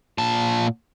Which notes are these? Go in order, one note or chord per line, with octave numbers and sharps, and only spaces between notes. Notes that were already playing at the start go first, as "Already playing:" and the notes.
A#2 A5